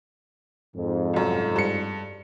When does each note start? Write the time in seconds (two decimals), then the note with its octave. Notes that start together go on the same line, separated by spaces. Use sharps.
0.77 F2 G#2
1.13 C2 F#2
1.56 G2 C#7